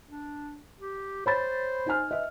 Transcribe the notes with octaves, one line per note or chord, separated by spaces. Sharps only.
D4
G4
C5 C#5 B5 A6
D#4 G#5 F6
B4 D#5 E5